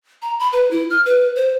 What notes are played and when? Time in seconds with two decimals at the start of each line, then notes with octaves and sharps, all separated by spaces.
0.22 A#5
0.39 B5
0.53 B4
0.71 E4
0.90 F6
1.06 B4
1.36 C5